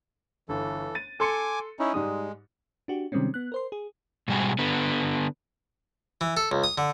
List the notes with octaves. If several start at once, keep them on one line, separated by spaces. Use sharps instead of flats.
G1 E3 A4
A6 D#7
A4 G#5 C6 D6 C#7
C#4 D#4 E4
G#2 G3 G#3 D#6
D4 F#4 G4
C3 D#3 G3 G#3 C4 C#4
B3 F#6
A#4 C5 C6
G#4
G#2 B2 G3 F#4 G#4
D3 B3
E3
A4
C#2
D#6
D3